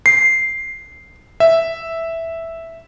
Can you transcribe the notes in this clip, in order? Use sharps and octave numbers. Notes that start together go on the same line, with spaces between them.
C7
E5